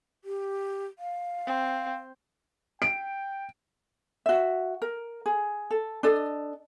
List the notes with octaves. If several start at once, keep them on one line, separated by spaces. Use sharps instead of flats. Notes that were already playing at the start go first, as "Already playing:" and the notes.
G4
F5
C4
G5 D7
F#4 E5
A#4
G#4
A4
D4 A4 D#5